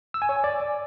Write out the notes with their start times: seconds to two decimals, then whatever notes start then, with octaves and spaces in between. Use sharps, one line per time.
0.14 E6
0.22 G#5
0.29 C#5
0.36 G#5
0.44 D5